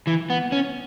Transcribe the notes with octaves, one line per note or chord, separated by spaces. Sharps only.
E3
B3
C#4